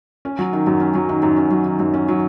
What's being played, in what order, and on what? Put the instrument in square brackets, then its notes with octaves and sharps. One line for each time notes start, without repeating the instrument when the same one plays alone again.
[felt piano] C#4
F#3
D#3
F#2
C#4
F#3
D#3
F#2
C#4
F#3
D#3
F#2
C#4
F#3